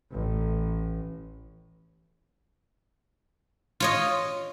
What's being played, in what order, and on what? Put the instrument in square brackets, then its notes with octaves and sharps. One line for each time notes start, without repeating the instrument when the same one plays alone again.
[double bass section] A1
[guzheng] F4 C#5 D#5